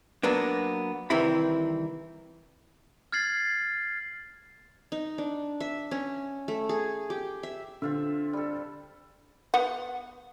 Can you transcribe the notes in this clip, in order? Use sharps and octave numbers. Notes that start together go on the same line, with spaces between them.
F#3 A#3 B3 D4
C2 D#3 E3 C4 E4 B5
F6 G#6 A6 C7 F#7
D#4
D4
E5
C#4
A3
G#4
G4
E5
D3 C4 F4 E5
G3 A4
B3 F#5